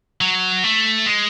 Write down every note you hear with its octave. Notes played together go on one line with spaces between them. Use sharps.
F#3
A3
G#3